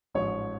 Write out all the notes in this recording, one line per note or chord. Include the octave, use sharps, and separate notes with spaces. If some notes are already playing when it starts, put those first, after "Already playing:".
A1 G#2 F3 C#5